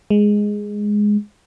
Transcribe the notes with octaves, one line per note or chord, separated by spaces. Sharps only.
G#3